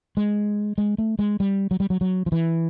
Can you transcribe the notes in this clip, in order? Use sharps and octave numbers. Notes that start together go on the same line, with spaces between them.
G#3
G#3
A3
G#3
G3
F#3
G3
F#3
F#3
F3
E3